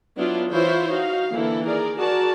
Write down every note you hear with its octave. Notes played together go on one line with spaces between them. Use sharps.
F#3 B3 D4 E4 F4
E3 E4 F4 C5 C#5 E5
D#4 F#4 F5
D3 E3 A#3 E4 A4
D#3 G#4 A#4 D5
F#4 G#4 A#4 D5 A5